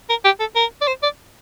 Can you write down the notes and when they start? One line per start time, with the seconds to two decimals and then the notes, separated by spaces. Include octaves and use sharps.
0.09 A#4
0.25 G4
0.40 A4
0.56 A#4
0.81 D5
0.88 C5
1.03 D5